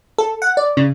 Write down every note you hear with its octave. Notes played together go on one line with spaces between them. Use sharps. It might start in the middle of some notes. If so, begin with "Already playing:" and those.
A4
F#5
D5
C#3